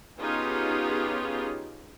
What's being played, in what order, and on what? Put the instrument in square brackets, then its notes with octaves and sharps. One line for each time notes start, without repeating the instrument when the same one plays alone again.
[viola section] B3 C#4 D#4 F4 G4 G#4